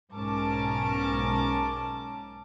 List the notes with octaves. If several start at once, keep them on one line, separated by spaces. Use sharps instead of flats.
B1 G#2 C#4 A#4 A5 D6